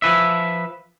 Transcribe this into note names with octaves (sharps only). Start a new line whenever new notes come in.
F3 B4 E5